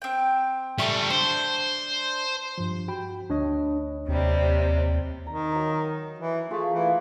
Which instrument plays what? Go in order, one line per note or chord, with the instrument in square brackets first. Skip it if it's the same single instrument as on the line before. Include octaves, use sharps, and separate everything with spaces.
[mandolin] C4 G5
[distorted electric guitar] G3 A4 [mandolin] E5 C#6 D#6
[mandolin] D4 [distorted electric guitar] C5
[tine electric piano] G2 F3
F#4 G5 B5
[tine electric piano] D2 C#5 D#5 [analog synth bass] D4
[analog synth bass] D#2 [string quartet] C3 G3
[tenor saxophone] D#3 [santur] A#5
[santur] F#3 D#4
[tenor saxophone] E3
[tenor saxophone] A3 [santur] F4 G#4
[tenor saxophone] E3 [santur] A#3